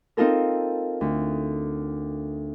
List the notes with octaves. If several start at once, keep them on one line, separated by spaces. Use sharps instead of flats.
C4 D#4 F4 A4 A#4
D2